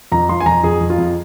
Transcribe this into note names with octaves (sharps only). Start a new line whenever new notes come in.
F2 A#5
F3 C6
G#5
F2 A#5
F2 G#4
F2
F4
F2